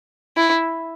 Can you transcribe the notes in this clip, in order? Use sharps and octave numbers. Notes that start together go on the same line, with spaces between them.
E4